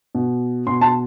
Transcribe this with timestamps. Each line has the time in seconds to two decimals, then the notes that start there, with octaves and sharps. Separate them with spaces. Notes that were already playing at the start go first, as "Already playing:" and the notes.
0.15 B2
0.67 B2 C6
0.81 A5 C6